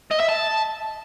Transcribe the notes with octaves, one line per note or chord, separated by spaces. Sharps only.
D#5
E5
A5